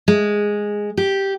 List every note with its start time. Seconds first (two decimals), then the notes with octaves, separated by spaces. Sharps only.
0.08 G#3
0.97 G4